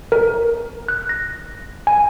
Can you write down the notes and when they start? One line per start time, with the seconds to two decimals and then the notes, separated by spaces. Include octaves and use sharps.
0.12 A#4
0.88 F#6
1.09 A#6
1.87 G#5